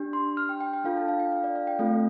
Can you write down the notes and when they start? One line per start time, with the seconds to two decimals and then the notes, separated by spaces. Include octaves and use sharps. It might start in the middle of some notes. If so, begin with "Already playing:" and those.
Already playing: D4 G4
0.13 C6
0.37 F6
0.49 G5
0.60 G5
0.73 G5
0.84 D4 F4 A4 F5
0.97 A5
1.08 F5
1.20 G5
1.32 F5
1.44 D5
1.56 F5
1.67 G5
1.79 A3 C4 F4 A4